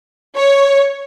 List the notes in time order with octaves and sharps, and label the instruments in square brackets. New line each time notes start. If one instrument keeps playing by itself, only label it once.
[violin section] C#5